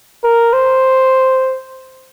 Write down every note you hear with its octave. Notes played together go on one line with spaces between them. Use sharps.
A#4
C5